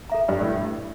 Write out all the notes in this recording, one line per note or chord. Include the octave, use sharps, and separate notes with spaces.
A4 E5 A#5
G2 D4
A2